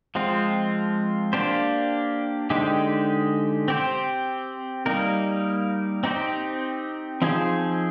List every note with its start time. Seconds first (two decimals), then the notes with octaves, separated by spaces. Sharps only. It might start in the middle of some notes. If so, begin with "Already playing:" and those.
0.15 F3 G#3 C4 F4
1.33 A#3 D4 G4 C5
2.50 D3 G#3 D#4 G4 C5
3.68 C4 G4 C5
4.86 G3 A#3 D#4 A#4
6.04 C4 D#4 G4 C5
7.22 F3 C4 D#4 G#4 C5